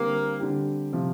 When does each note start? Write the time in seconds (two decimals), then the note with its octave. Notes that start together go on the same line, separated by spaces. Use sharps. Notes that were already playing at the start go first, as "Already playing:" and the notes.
Already playing: D3 G3 A#3 C4 G4
0.39 D3 G3 C4 G4
0.93 C3 F3